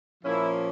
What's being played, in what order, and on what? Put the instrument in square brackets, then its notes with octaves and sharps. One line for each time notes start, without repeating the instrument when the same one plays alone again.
[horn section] A#2 F3 A#3 C#4 E4